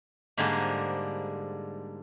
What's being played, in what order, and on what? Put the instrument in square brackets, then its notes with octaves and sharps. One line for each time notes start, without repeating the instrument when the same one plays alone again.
[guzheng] G#2 D3 G3 A#3 G#4 C5